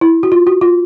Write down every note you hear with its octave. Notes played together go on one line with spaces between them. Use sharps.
E4
F#4
F4
F#4
F4